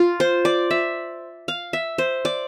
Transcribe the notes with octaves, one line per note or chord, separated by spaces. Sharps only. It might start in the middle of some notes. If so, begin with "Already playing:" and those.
Already playing: F4
C5
D5
E5
F5
E5
C5
D5